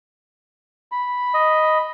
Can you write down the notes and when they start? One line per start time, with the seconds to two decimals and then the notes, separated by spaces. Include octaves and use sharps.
0.92 B5
1.34 D#5